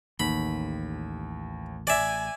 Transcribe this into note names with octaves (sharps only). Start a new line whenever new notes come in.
A1 D#2 B5
D5 E5 G#5